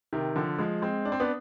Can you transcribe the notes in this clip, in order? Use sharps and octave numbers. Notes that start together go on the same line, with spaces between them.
C3 D#3
D3 F3
F3 G#3
G#3 C4
D4
C4
B3 D4